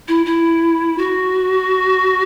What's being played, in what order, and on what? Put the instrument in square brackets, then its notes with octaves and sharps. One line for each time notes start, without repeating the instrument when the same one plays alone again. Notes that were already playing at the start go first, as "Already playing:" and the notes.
[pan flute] E4
E4
F#4